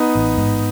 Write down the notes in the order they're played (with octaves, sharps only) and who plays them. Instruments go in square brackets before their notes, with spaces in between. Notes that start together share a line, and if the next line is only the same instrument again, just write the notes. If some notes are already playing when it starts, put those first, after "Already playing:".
Already playing: [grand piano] B3 D#4
[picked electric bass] A1
G#2